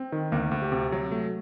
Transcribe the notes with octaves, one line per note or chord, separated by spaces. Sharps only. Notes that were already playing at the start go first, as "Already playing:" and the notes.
Already playing: C4
D#3
D2 A#3 A#4
D2
G4
C3
F#3
A3